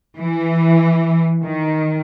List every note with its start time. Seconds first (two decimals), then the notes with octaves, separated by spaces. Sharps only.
0.18 E3
1.45 D#3